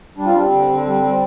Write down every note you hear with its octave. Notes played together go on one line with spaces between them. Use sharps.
G3 D4
C4 F4
G3 D4
C4
D3
D3
G3
G3